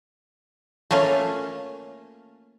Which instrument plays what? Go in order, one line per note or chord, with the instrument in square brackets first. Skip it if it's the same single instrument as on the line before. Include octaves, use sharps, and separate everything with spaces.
[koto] A3 A#3 C#4 F4